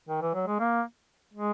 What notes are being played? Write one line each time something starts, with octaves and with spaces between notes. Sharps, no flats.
D#3
E3
F#3
G#3
A#3
G#3